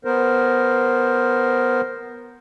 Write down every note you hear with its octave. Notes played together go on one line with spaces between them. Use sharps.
B3 A#4 C5